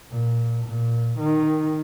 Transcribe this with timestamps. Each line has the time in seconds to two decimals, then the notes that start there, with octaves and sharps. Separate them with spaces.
0.11 A#2
0.65 A#2
1.19 D#3